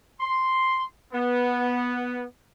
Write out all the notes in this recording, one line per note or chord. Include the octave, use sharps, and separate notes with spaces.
C6
B3